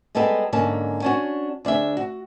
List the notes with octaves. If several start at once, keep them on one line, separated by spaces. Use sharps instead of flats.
G3 G#3 B3 G4 A4
G#2 D3 A#3 C#4 A5
C#4 D4 F#4
D2 D4 G#4 E5
F#4